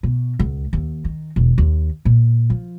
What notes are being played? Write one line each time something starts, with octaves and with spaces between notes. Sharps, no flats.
B2
C#2
D#2
D#3
E1
D#2
A#2
F3